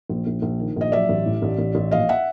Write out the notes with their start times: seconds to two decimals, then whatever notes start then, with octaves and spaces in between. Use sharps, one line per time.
0.09 A#1
0.27 A#1
0.42 A#1
0.59 D#3
0.76 A#1 D#5
0.92 F#3 D5 E5
1.09 A1
1.26 A2
1.42 A1
1.59 A1
1.75 A1
1.91 A#1 D#5 F5
2.09 E5 F#5